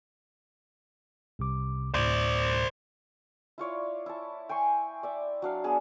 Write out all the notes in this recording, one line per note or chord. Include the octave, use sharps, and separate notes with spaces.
C2 C3 D6
D2 A2 C5 D5
E4 F4 C#5 D5
E4 A5
G5 G#5 C6 C#6
D5 E5
F#3 D4 F5
B3 D4 G#4 E5